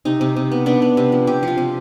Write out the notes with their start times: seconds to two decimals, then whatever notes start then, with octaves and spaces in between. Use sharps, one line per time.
0.05 C3 D#4
0.21 C3
0.36 C3
0.51 B3
0.66 B3 D4
0.82 B3
0.97 C3
1.12 F3
1.27 C3 G4
1.43 F3 F4
1.58 C3